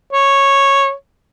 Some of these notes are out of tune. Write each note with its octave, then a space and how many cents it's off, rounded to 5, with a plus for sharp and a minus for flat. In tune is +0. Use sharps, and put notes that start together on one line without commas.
C#5 -10